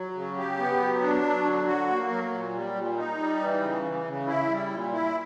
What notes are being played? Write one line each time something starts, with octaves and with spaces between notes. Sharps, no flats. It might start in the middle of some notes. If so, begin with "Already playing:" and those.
Already playing: F#3
C#3
G4
B3
F#3
D4
F#3
D3
F#4
A#3
F#3
A#2
G3
A#2
D#4
G3
E3
C#3
E3
C#3
E4
G3
A#2
E4